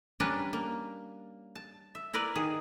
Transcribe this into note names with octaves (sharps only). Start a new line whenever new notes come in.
G3 C#4 D4 A#4 B4 A5
A#3
A5
E5
E4 A#4 B4 D5
D#3 G#4